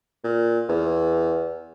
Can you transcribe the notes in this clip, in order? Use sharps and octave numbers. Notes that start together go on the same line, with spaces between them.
A#2
E2